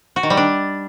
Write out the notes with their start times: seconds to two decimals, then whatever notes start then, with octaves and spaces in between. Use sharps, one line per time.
0.16 F#4
0.23 D#3
0.30 G3
0.37 D4